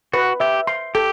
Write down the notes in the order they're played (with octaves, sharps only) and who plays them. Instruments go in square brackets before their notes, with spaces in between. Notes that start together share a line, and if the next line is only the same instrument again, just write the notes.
[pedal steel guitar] F#4 [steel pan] B4
[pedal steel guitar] G4 [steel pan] E5
[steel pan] C6
[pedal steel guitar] G4 [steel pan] A4